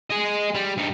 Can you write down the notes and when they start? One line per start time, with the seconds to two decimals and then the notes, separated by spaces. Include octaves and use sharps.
0.10 G#4 D#5
0.54 G3
0.77 G2 D#4